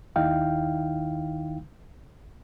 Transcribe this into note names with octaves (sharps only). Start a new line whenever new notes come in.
D#2 D#3 D#4 E4 F5 G5